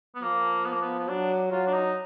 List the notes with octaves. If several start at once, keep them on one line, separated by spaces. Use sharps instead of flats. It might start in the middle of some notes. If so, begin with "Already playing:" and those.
B3
F3 A#3
B3
A#3
B3
B3
F#3 D4
F#3 F4
D4
D#4